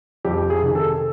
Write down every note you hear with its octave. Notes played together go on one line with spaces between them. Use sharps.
F2 G4
G#4
C3 D#3
A4